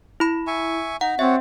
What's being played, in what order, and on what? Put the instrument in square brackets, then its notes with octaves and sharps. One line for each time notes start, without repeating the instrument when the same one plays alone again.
[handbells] E4 B5
[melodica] E5 G#5 C#6
[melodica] D#4 A#5 [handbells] F#5
[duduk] C4 [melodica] F#4 C#5 F#5 [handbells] E5